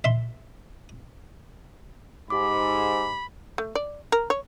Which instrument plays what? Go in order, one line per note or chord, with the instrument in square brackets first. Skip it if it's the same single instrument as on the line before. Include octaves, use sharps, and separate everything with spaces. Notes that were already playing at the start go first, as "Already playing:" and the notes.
[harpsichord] E5 C6
[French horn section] G#2 [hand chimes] G4 D6 [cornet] B5
[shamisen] A3
D5
A#4
C#5